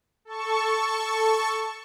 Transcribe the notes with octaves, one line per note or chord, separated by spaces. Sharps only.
A4 A5 C#6